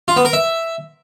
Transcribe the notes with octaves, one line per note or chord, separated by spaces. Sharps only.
F4
B3
A#4
E5